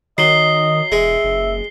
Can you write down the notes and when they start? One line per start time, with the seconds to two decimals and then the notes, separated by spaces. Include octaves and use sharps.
0.18 D#3 F#3 D#5 C7 G7
0.92 E1 G#3 E5
1.24 F#1